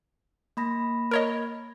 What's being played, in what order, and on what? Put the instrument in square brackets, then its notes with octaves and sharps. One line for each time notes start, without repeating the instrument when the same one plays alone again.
[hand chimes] A#3 B5 A#6
[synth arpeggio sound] A#4 C#5 D#5